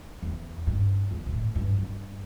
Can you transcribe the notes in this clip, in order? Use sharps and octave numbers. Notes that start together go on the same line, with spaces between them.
E2
G2
E2
B2
A2
G2
G2